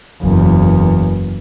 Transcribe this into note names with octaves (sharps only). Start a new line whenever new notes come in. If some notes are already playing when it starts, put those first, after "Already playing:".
F#1 E2